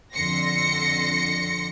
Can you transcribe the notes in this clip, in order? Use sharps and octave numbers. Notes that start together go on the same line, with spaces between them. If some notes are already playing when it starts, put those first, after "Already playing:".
F2 D3 C6 A#6 C#7